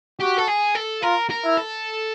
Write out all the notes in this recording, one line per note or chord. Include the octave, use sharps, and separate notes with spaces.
F#4 G4
A4
G#4
A4
F4 A#4
A#4
E4
A4